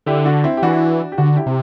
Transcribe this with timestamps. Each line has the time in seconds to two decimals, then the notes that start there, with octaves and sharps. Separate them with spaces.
0.06 D3 E4 G4
0.25 D4 F#4
0.44 C4 E4
0.57 G4
0.62 E3 D4 F#4
1.12 G4
1.18 D3 D4 F#4
1.36 E4 G4
1.46 C3